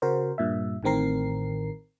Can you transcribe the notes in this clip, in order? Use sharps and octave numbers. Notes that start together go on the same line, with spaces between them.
C#3 F#4 A#4 C5
G2 A#2 E5
A1 A2 D#3 C4 A#4 C7